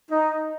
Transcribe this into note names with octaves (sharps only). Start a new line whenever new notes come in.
D#4